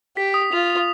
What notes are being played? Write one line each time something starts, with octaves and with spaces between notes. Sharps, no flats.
G4 B6
D#6
F4 F7
F7